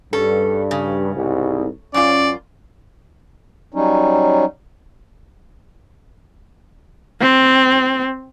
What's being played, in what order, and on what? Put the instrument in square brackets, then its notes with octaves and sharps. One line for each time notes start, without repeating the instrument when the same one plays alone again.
[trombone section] G2 [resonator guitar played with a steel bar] C#4 A4
[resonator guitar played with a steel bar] C#3
[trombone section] C2 G#2
[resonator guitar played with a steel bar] F#2 F4 [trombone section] C#4 [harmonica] D5
[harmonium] F#3 G3 C#4 D#4
[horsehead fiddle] C4